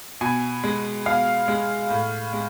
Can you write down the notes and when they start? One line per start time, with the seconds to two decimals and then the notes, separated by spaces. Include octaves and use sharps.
0.21 B2 G#5
0.64 G#3
1.06 B2 F5
1.48 G#3
1.90 A2
2.33 G#3